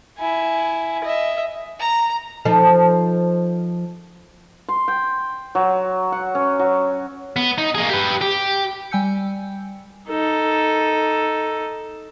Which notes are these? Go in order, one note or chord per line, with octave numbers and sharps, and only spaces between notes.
E4 G#5
D#5 E5
A#5
F3 D#4 A4
C6
G5
F#3
F#5
C#4
F#3
B3
D#4
A#3 G#4
G4 B4
G4
G3 G5 G#5 E6 G6 C#7
D#4 A4